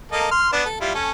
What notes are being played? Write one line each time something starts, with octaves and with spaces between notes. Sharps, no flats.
A#3 A4 D#5
C6 F6
B3 D4
A4
G3 E4 F4
C#4 A4